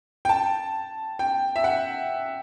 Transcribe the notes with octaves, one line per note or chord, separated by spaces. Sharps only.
G5
A5
G5
E5
F#5